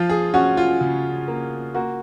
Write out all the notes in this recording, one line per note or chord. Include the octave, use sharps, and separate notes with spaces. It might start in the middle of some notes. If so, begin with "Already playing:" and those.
Already playing: F3 F4
G#4
C#4 F#4
F4
C#3
A#3
A#3 F#4